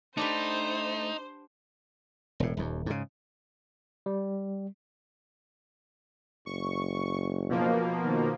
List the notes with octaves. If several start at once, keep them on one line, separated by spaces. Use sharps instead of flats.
A3 D4 D#4 G4 B4 C5
E1 A2
D#1 D#2
G#2 C#3
G3
F#1 C#6
B2 F3 A#3
D#3